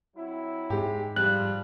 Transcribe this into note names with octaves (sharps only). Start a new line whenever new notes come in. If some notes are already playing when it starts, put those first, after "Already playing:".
F#3 C4 E4
G#2 G#3 G4
F3 G3 F#6